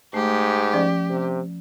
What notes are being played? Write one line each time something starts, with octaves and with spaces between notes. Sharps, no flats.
G#2 A3 G4
F3 C#4 D5
C3